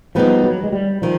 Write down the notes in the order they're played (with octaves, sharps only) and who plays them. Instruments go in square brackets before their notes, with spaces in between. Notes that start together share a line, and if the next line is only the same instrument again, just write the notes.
[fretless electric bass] F3 [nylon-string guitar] G3 B3 D#4 G#4
[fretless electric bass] F#3
G#3
G3
[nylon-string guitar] D#3 [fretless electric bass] F3